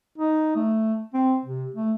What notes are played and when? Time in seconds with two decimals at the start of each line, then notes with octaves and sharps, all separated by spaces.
0.18 D#4
0.56 A3
1.14 C4
1.45 C3
1.75 A3